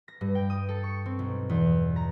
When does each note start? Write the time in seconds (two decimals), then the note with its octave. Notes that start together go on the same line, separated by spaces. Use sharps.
0.08 A#6
0.21 G2
0.35 G5
0.50 D#6
0.69 A4
0.83 C#6
1.06 C4
1.19 B1
1.50 E2
1.96 A#5